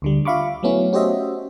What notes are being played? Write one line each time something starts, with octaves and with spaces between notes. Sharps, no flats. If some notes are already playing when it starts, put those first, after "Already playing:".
D2 D3 G3
F4 E5 F5 B5 C#6 D6
F#3 A3 B3 C#4 E4
C#4 F#4 G4 C5 D#5 E5